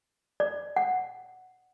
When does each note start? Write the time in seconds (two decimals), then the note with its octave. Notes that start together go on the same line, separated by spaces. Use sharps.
0.40 D5
0.76 F#5